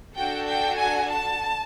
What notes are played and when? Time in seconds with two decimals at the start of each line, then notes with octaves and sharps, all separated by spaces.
0.17 D4 F#4 A4 G5
0.48 G5
0.79 G#5
1.12 A5